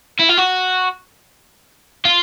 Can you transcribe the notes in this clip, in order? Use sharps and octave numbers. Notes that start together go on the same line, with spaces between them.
E4
F4
F#4
F4